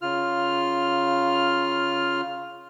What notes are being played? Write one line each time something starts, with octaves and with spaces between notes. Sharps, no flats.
C#3 F4 F6